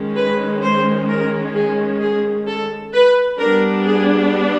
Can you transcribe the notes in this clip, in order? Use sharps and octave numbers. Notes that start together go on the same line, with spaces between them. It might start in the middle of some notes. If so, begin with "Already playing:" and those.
Already playing: D#3 G#3 C#4
B4
C5
A#4
G#4
G#4
A4
B4
G3 B3 D4 A#4
G#4